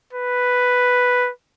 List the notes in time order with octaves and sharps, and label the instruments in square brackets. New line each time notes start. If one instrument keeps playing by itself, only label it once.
[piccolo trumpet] B4